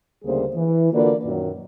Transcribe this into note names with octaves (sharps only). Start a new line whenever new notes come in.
D2 C#3 G3 A#3 G#4 C5
E3
D3 A#3 F4 F#4 B4 D5
F#2 A#2 D#3 F#3